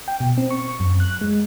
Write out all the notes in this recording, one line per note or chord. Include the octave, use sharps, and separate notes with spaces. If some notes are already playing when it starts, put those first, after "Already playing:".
G5
B2
C4
C#6
F#2
F#6
G#3